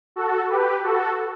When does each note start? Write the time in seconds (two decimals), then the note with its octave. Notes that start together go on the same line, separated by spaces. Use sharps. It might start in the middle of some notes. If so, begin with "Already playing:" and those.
0.16 F#4 A4
0.49 G4 B4
0.84 F#4 A4